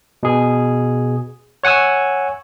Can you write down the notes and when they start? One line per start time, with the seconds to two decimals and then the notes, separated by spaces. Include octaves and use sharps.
0.23 B2 G#4
1.63 C#5 F#5 G#5 C#6 E6